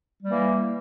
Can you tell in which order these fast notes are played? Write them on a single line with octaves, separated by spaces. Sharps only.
G3 A#3 E3